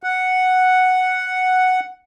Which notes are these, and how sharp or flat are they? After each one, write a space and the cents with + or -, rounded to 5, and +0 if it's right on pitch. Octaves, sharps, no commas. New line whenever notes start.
F#5 +0